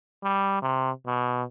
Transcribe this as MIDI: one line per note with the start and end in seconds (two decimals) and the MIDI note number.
0.24 0.60 55
0.62 0.91 48
1.06 1.43 47